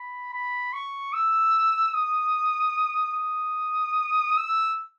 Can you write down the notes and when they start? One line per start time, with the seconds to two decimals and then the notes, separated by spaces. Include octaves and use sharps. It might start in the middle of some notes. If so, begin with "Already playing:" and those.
Already playing: B5
0.33 B5
0.73 C#6
1.13 E6
1.94 D#6
3.15 D#6
4.37 E6